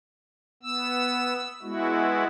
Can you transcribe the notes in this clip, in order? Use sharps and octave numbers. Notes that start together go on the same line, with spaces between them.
B3 E6
G#3 B3 E4 F#4